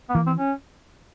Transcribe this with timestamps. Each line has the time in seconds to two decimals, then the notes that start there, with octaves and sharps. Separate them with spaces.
0.09 B3
0.15 E3 A#3
0.27 C4
0.38 C#4